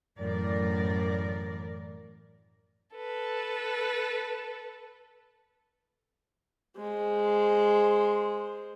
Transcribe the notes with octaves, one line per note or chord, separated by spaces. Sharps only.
F#2 A2 E3 A#4 D5
A4 B4
G#3 C5